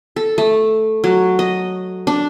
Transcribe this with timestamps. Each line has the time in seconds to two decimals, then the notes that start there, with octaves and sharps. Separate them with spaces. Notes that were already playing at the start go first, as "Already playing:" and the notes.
0.16 A4
0.38 A3
1.04 F#3
1.39 D#5
2.07 D4